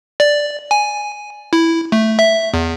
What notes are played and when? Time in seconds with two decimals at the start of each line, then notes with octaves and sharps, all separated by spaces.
0.20 D5
0.71 G#5
1.53 E4
1.92 A3
2.19 E5
2.54 E2